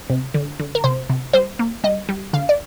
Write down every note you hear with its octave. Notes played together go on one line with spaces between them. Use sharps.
C3
D3
D3
A#4
C3 C5
C3
G3 C5
A#3
G3 D#5
G3
D3 F5
D5